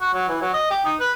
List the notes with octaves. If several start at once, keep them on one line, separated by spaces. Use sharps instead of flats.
F#4
F#3
E3
F#3
D#5
G4
D#4
B4